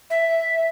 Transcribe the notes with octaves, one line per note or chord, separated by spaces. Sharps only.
E5